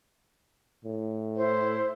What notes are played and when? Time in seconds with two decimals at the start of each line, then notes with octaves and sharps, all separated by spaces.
0.85 A2
1.37 E4 C5